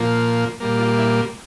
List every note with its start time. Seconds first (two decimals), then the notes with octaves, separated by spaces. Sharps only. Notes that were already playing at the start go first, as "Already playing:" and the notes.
Already playing: A#2 F3 A#3
0.60 A#2 G3 A#3
0.79 F4
0.98 E4